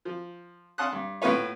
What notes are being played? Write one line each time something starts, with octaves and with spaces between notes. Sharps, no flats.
F3
F5 F#5 A5 C6 D#6 F#6
G2
A2 B3 F4 B4 C#5